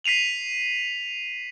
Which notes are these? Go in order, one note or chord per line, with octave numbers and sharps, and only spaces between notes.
B6 C7 D#7 F7 F#7